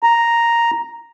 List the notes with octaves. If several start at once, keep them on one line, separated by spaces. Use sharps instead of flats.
A#5